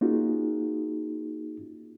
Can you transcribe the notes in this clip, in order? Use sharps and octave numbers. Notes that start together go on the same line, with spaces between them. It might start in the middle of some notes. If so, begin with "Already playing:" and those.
A#3 C#4 D#4 F4 F#4 G#4